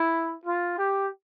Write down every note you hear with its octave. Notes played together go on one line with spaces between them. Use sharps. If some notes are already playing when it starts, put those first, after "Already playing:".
Already playing: E4
F4
G4